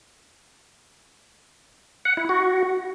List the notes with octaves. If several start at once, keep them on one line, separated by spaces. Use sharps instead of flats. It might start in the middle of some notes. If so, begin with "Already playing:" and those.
F#5
E4
F#4